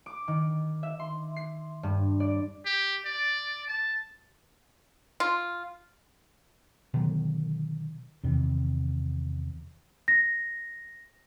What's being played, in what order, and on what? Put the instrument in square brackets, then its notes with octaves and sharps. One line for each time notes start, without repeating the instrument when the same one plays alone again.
[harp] D6
D#3
E5
C6
C7
G2
D5
[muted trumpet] G4
D5
A5
[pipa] F4
[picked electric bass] B2 D3 D#3 F#3
[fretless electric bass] E2 C3 D#3
[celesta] A#6